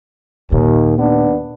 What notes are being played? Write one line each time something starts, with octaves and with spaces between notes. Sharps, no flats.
D#2 A#2
D#2 B3 D4